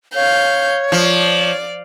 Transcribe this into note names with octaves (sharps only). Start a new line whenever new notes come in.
C#5 F5 G6
F3 D5